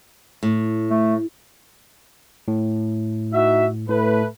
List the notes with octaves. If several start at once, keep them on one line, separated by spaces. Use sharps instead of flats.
A2
A3
A2
D#4 F#4 E5
A2 A3 B4